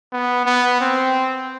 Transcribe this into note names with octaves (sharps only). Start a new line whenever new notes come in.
B3
B3
C4